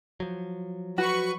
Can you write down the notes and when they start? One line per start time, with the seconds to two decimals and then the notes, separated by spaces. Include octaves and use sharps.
0.20 F3 F#3
0.98 F#4 B4 C#6